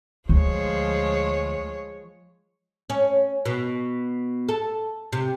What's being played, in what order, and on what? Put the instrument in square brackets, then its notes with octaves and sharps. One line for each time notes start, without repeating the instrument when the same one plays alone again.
[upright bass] D2 [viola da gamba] F3 G#3 C#5
[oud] C#4
B2
A4
C3